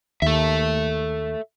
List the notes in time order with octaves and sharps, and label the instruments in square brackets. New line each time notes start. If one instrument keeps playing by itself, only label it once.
[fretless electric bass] D#2 [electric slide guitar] A4 E5